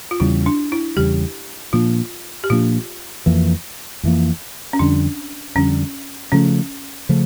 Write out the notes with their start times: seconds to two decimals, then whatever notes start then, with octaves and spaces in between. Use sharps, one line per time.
0.11 F4
0.20 E2 C#3 G3 E4
0.46 D4
0.72 E4
0.96 E2 C#3 G3 G4
1.73 A#2 F3 A#3 D4 F4
2.44 G4
2.50 A#2 F3 A#3 D4 F4
3.26 F2 E3 A#3
4.03 F2 E3 A#3
4.73 C#4
4.79 F2 D3 G3 D4
5.55 F2 D3 G3 C#4
6.32 C#3 F3 A3 C#4
7.09 C#3 F3 A3